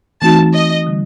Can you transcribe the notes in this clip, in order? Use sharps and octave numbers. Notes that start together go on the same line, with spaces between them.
E3 A3 C4 D#4 F#4 A5
D#5
D3 G3